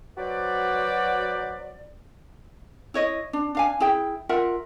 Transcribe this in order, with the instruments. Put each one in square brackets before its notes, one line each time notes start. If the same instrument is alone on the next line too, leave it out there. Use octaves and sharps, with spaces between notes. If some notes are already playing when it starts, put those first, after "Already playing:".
[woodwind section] F#3 F#4 B4 C5 D5
[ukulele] E4 C#5 D#5
D4
D4 F5 G#5
E4 G#4 G5
F4 A#4 E5 F#5